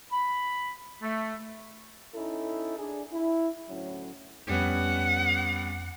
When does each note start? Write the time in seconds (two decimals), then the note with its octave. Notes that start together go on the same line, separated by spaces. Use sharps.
0.12 B5
1.02 A3
2.14 C#4 D#4 E4 A4
2.78 D4 G#4
3.11 E4
3.68 D2 A2 F#3 C#4
4.49 F2 G3 B3 C#4 F#5